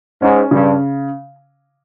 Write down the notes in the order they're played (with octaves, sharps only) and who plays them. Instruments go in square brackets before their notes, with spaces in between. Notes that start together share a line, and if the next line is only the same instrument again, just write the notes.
[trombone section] G#2 [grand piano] C#4
[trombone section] G2 [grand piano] C#3